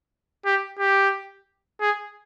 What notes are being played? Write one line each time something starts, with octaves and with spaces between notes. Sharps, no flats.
G4
G4
G#4